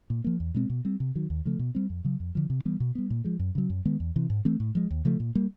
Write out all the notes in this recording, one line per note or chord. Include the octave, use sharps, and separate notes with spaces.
A#2
F3 A#3
E2
B2 G#3 C4
B2
G3 C4
C3
D#3 F#3
D#2
C#3 F3 A3
B2
G3 C4
F2
C#3 F#3
F2
D3 F3
C3
E3 G3 B3
B2
G3 B3
A#2
F3 G#3
F#2
C#3 F#3
F#2
D#3 G#3 B3
E2
C3 E3
G#2
E3 A3 C4
A2
F3 G#3
D#2
C#3 F3 A3
A#2
G3 A#3